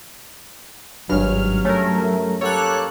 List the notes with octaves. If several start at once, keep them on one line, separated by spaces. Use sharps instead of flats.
G#1 G2 F#3 C#4 F6
A3 C#4 A#4
A#3 G4 A4 C#5 F#6